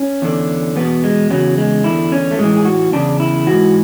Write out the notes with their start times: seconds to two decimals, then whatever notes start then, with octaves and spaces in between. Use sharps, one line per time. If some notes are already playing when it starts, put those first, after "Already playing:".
Already playing: C#4
0.22 E2 D3
0.76 E2 B2 B3
1.04 G#3
1.30 E2 C#3 F#3
1.58 G#3
1.84 E2 D3 E4
2.12 C#4
2.31 A3
2.39 A2 E3 G#3
2.57 G#4
2.65 F#4
2.92 E2 C#3 D4
3.20 E4
3.46 G#2 E3 F#4